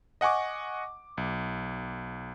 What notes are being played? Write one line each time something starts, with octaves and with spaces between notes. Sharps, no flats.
D#5 F#5 G#5 C#6 D6
B1